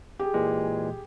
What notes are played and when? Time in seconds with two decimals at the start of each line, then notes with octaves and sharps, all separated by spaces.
0.19 G4 G#4
0.34 A#2 E3 G#3